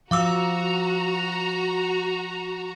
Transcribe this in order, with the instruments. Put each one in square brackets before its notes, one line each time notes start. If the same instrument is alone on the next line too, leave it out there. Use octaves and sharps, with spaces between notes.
[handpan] F3 [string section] F#4 A#5 [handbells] F5 D6 E6